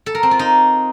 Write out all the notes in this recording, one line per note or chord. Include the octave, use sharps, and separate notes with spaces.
A4
A#4
C4
F4
D#4